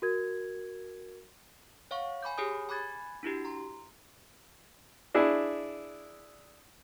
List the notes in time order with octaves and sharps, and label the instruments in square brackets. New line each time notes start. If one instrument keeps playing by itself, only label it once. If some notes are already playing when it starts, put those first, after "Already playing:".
[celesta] F#4 A#4 G#6
[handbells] C#5 F5 F#5 C#6
G#5 B5 D6 G6
G4 G#4 C#5 G#5 D#6 G6
G#5 B5 D6 F#6 G#6 A6
D4 E4 F#4 G4
A#5 C6
[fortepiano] D4 E4 G#4